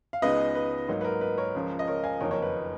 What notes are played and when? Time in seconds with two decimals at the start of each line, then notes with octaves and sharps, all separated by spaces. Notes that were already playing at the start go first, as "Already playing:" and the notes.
0.13 F5
0.22 C#2 C#3 G#3 B3 D#4 B4 D#5
0.55 B4
0.88 G#2 F#3 A#3 D#4
1.01 B4
1.04 A#4
1.21 B4
1.38 A#4 C#5
1.55 C#2 C#3 F3
1.79 D#5
1.87 A#4 C#5
2.03 F5 G#5
2.20 F#1 F2 D#3 A#3 D#4 A#4 C#5
2.31 A#4 C#5
2.42 B4